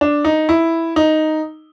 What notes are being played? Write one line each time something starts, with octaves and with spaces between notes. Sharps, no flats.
D4
D#4
E4
D#4